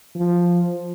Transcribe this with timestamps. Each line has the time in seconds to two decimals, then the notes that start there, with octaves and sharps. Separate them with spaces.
0.15 F3